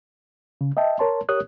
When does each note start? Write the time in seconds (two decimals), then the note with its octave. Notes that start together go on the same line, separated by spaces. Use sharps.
0.61 C#3
0.77 D#5 E5 G5 A5
0.99 A#4 C#5 A5 C6
1.29 G4 A#4 C#5 D#6 F#6